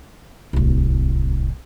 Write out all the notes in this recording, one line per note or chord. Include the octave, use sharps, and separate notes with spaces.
D1 C2